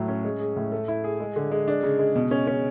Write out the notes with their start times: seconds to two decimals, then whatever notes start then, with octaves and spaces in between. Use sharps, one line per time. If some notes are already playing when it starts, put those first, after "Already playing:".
Already playing: A2 F#3
0.08 C#4
0.24 G#3
0.40 G#4
0.56 A2
0.72 A3
0.88 E4
1.04 G#4
1.20 G#3
1.36 D3
1.51 G#3
1.68 D4
1.83 C#3
1.99 G#3
2.15 B2
2.31 C#4
2.47 C#4